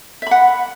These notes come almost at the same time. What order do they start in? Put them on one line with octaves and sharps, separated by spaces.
E5 B5 F#5